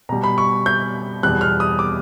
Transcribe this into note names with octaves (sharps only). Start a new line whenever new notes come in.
B2 G3 A#5
B5
C#6
G6
E2 B2 G3 F#6
F6
D#6
D6